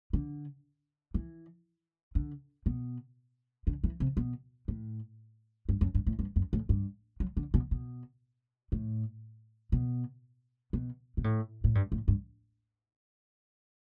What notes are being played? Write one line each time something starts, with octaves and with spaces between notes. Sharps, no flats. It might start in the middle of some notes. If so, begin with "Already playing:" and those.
D3
E3
D3
B2
D3
E3
C3
B2
A2
G2
F#2
G2
A2
G2
F#2
A2
G2
F#3
D3
B2
B2
A2
B2
B2
B2
A2
A2
G2
A2
G2